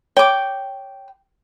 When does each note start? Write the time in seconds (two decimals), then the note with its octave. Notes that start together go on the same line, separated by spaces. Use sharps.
0.17 C#5 G5 D6